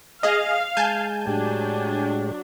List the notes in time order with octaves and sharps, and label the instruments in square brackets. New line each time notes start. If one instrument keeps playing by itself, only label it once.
[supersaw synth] G#4 D#5 [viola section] F5
[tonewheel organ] G#3 [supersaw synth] G#5 A5 G6
[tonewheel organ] A2 G#3 G4 [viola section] F#3 D4